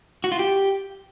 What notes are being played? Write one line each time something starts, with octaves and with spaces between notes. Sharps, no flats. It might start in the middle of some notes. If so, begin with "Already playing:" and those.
F#4
F4
G4